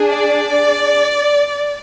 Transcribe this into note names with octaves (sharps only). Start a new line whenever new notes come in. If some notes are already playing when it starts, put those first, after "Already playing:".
Already playing: D4 G#4
D5